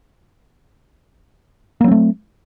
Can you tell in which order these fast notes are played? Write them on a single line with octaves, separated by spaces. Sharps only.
A#3 F#3 C4 A3